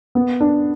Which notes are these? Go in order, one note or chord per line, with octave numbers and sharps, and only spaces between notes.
B3
D4